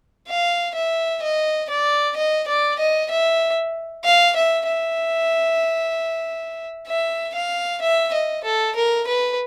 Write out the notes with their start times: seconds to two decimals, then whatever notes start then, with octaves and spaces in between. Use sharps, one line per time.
0.28 F5
0.75 E5
1.22 D#5
1.70 D5
2.16 D#5
2.48 D5
2.79 D#5
3.11 E5
4.05 F5
4.36 E5
4.68 E5
6.88 E5
7.35 F5
7.82 E5
8.13 D#5
8.44 A4
8.76 A#4
9.07 B4